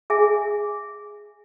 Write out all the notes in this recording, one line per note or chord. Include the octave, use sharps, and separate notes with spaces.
G#4 E5 G#5